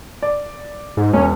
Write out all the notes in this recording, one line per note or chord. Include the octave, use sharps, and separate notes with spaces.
D5
G#2
E1 C#4